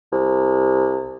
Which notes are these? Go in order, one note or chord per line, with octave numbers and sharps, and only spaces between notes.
C2